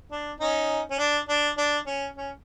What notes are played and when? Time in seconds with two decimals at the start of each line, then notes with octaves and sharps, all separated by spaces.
0.11 D4
0.40 C#4 D#4
0.90 C#4
0.99 D4
1.29 D4
1.58 D4
1.86 C#4
2.17 C#4